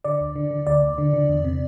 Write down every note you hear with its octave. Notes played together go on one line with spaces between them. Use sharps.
D3 D5
D2
D3
D3
D2 D5
D2
D3
D3
E2
C3